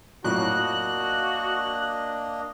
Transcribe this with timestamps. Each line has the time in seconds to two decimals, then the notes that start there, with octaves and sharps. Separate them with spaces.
0.24 F2 A2 F#3 A#3 D4 F#4 D#5 F#6